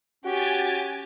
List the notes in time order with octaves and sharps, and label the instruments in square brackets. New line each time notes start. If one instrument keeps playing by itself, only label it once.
[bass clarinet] C#4 [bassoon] F#4 [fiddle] G4 [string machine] G#5 G#6 A6